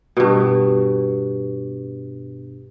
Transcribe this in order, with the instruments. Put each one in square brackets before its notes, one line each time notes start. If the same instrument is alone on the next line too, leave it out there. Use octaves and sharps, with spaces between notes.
[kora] G2 B2